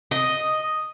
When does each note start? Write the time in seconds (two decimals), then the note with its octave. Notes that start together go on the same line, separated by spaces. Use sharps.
0.11 D#5